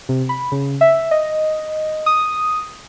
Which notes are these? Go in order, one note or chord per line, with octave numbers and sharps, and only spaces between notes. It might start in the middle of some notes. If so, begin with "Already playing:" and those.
C3
B5
C#3
E5
D#5
D#6